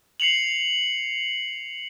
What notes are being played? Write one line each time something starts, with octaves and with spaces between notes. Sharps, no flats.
C7 C#7 F7 F#7